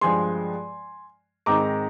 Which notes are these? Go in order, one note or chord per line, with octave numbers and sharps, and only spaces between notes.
G2 F3 G#3 G#5 C6
G#2 D#3 G#3 C4 D#4 A#5 D6